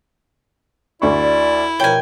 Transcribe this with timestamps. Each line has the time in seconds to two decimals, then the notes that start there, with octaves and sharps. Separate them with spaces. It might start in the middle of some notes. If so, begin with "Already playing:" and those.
1.02 D2 E4 D5 C#6
1.80 G2 B2 F3 A#4 C#5 G5 G#5